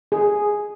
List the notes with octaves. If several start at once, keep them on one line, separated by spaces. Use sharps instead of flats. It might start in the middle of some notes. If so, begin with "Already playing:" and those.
G#4